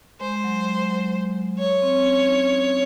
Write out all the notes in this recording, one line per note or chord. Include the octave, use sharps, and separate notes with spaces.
G#3 C5
G#3
F#3
G#3
F#3
C#5
C4
C#4
D#4
D#4